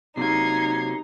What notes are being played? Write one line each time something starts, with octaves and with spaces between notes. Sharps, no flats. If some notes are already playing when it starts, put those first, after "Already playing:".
C3 F#3 A#3 D#4 G#6 C7